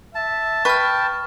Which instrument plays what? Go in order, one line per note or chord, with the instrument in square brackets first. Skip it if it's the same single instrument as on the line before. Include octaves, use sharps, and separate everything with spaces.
[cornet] E5 [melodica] A5
[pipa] B4 [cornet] G5 [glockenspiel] C#6 F6